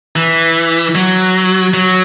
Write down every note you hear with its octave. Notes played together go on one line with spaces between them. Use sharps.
E3
F#3
F#3